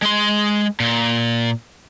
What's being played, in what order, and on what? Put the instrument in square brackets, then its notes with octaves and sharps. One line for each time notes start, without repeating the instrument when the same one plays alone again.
[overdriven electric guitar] G#3 C6
A#2